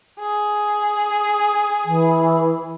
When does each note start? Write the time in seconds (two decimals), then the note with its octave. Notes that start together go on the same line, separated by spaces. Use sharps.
0.18 G#4
1.85 E3